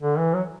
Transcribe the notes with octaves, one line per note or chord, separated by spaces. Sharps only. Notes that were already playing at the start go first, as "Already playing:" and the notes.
D3
E3
F#3